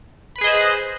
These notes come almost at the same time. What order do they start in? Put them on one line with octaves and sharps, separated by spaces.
B5 B4 G#4 D#5 C5